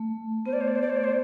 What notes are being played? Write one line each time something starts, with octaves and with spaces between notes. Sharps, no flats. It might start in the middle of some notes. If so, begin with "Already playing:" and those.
Already playing: A3
B3 C5
D5
C5
D5
C5
D5
C5
D5
C5